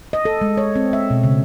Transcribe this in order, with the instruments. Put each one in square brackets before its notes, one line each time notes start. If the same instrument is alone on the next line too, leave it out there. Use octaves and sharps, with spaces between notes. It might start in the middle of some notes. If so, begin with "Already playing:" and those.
[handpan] D#5
A4
G#3
C#5
C4
E5
B2
C#3